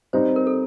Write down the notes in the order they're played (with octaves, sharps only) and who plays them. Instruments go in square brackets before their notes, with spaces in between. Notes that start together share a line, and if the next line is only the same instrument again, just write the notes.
[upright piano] G3 C4 D#4 [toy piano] C5
[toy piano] A#4
A4